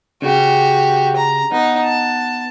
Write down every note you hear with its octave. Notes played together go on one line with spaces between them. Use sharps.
C#3 F#4 G4
A#5
B3 D#4
A5